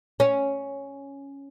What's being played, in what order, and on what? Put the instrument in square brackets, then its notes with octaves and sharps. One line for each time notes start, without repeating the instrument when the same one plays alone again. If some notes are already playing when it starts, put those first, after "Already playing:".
[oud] C#4